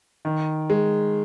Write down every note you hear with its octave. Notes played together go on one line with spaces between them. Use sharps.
D#3
G#3